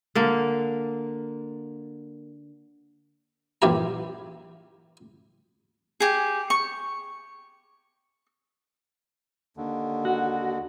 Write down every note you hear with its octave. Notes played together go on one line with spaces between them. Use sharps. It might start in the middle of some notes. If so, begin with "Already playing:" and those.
D3 A#3
A#1 F#2 E3 E4 G4 A#5
G4 G#4
C#6
D#2 D3
F#4